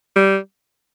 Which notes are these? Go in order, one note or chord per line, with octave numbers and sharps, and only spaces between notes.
G3